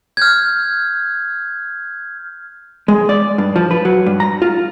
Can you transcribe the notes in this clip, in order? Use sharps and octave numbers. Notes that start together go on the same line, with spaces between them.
F6 G6 G#6
G#3
D5
G2
F3
B4
F#3
G2
A#5
F4